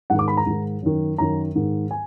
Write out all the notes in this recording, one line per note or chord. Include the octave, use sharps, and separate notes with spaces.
G#2 D#3 F#5
D6
B5
A#5
G#2 D#3
F#2 D#3
F#2 D#3 A#5
G#2 D#3
G#5